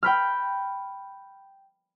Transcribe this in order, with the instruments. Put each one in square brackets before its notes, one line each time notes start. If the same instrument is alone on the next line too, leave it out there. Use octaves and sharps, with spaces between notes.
[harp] G5 B5 F6